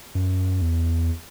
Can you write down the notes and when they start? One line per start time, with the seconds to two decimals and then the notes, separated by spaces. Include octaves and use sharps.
0.15 F#2
0.62 E2